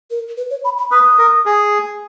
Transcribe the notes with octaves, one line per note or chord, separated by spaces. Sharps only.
A#4
B4
C#5
B5
B5
B4 D#6
A#4
G#4